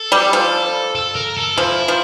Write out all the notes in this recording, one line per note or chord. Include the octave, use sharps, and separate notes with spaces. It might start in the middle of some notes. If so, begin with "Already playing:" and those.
Already playing: A4
G3
F3
A4
A#4
A4
F3 E4
F3